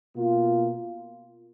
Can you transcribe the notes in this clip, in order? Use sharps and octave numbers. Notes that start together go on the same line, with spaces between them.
B2 A#3 F4